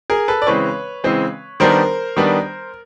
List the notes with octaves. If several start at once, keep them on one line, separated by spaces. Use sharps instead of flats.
G#4 A#4
A4 B4
D5
C#3 E3 G#3 C4 B4 C#5
C#3 E3 G#3 C4
D#3 G3 B3 D4 A#4 C5
D#3 G3 B3 D4